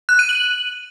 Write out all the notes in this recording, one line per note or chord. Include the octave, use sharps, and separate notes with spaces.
F#6
D#7
F#7